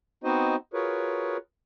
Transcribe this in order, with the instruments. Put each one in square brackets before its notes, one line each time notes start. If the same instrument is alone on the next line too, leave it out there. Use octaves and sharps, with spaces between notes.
[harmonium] B3 C4 D#4 F#4 C5 D#5
F4 F#4 G#4 A#4 B4 C#5